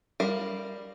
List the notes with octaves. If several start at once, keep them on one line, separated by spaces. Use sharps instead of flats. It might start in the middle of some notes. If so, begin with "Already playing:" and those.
G3 A#4 F5